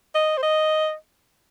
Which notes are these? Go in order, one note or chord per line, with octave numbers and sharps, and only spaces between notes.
D#5
C5
D#5